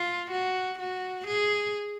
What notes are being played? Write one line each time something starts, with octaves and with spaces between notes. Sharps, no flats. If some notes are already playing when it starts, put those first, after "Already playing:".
Already playing: F4
F#4
F#4
G#4